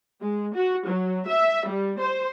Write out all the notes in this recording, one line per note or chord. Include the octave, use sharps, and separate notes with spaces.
G#3
F#4
F#3
E5
G3
C5